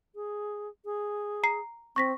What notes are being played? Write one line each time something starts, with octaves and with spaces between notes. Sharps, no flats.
G#4
G#4
A#5 C7
C4 C#6 A#6 B6